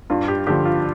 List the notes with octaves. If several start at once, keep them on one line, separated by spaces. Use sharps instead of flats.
G2 F4
G4
D3 F3 G4
F4